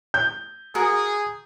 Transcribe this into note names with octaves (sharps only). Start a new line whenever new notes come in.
G6
F#4 G#4 A#4